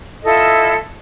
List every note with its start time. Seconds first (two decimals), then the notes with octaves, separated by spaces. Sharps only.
0.24 E4 F4 A4 D#5